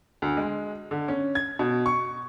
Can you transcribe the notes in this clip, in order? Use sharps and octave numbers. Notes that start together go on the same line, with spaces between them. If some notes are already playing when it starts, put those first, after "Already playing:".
D2
G#3
D3
C#4
G#6
B2
C#6